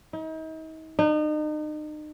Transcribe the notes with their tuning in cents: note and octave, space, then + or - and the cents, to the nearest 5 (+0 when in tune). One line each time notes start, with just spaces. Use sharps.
D#4 +40
D#4 -35